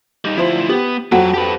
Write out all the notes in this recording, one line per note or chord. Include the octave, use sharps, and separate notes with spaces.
G3 D#4
D2 F3 E4 C5
B3 G4
F2 F#3 F#4 F#5
G4 B4